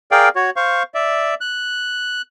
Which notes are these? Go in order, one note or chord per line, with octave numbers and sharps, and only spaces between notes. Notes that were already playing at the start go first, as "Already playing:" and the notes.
G#4 A#4 D5 F5 G5
F#4 C#5
C5 F5 C#6
D5 E5
F#6